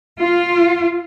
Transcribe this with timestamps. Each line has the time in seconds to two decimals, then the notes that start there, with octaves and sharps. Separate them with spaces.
0.20 F4